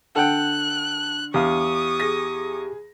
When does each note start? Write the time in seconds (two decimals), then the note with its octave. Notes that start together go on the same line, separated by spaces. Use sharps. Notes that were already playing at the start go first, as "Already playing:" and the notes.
0.16 D3 A4 F#5 G5 F#6
1.34 E2 G4 F5 C#6 D#6
2.00 G#4 A#6